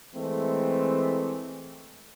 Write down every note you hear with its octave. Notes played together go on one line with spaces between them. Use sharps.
E3 G#3 A3 C4